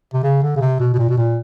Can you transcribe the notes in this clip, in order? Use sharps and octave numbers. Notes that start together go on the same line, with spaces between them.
C3
C#3
D3
C#3
C3
B2
B2
A#2
B2
A#2